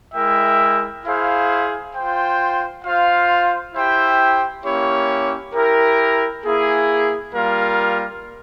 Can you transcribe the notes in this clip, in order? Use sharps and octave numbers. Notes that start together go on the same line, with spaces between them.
G#3 E4 A#4 E5 G5
E4 G#4 C5 F5
F4 C5 G5
F4 C5 F5
E4 G4 C5 E5 G5
A#3 C#4 E4 G4 C#5
E4 G4 A#4
A#3 E4 G#4
G3 A#3 F4 A#4 F5